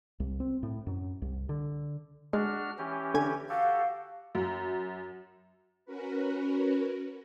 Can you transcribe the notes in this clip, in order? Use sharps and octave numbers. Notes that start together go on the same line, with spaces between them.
C2
C4
A2
F#2
C2
D3
G#3 D4 F#4 F6
E3 C#4 G4
D3 G#5
F#4 G4 A4 F5
F#2
C#4 F#4 A#4 B4